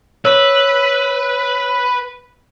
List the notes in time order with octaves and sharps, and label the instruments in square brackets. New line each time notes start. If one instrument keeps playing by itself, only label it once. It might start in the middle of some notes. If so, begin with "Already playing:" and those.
[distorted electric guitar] B4 [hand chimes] C#5 E6